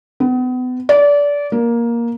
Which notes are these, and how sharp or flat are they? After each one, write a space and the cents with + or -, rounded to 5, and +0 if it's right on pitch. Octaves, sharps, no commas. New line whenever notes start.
B3 +35
D5 -25
A#3 +10